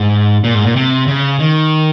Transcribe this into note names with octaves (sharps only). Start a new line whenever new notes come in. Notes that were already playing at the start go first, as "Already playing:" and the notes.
Already playing: G#2
A#2
G#2
A#2
C3
C#3
D#3